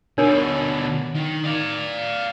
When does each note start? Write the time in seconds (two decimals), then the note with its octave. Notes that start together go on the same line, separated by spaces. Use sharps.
0.18 B2 D3 D4 A#4 C#5
1.15 D#3
1.44 D5 F5